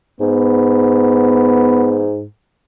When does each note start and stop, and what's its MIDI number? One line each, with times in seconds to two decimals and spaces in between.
0.20 2.25 44
0.20 2.09 59